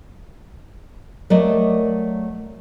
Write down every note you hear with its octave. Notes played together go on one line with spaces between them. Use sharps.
F#3 A3 A#3 A#4 D5 D#5